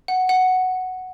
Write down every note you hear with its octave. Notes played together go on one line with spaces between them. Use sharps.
F#5
F#5